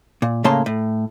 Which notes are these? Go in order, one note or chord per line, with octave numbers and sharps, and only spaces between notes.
A#2
A2 C#3 A#3 C#5 A5 C6
A2